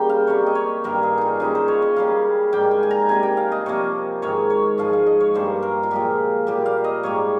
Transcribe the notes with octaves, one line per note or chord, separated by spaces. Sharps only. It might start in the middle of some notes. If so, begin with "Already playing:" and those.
Already playing: C#3 G3 A#3 G5 A#5
F5
C3 G3 A#3 C#5
D#5
C#5
G2 D#3 G3 A#3 A#4
G#4
D#4 F4
C#3 G3 A#3 D#4
C5
C#5
D#5
C#3 G3 A#3 F5
G#2 G3 A#3 G5
G#5
G#5
A#5
C3 G3 A#3 G#5
G5
F5
D#5
C3 F3 A#3 C#5
G#2 D#3 G#3 C#5
C#5
G#2 F3 G#3 F5
F5
D#5
C#5
G2 G3 A#3 C5
A#4
F4
A#2 F3 G#3 G4
A#2 G3 A#3 G4
F5
D#5
G#2 G3 A#3 C#5